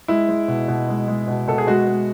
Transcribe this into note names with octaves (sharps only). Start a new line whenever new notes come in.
G#3 E4
G#3
B2
B2
G#3
G#3
B2
B2 A4
G#4
G#3 F#4
G#3